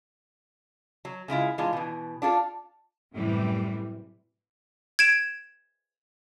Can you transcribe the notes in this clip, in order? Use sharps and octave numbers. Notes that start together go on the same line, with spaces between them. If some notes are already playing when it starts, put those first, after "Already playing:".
F#3
C#3 G#3 E4 F4
E3 G#3 D4 F4
B2 E3
D4 F4 G#4 A4
F#2 A2 C3 E3 G3
G#6 D7 E7